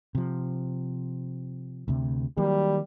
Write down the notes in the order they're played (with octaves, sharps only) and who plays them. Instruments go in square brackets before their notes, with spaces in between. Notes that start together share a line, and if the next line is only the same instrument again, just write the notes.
[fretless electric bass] C3 F3
D2 C3
[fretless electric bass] D#3 F#3 A#3 [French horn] G3